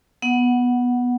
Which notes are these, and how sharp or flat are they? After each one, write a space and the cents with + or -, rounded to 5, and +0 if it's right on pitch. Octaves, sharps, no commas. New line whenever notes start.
B3 -10 F#5 +0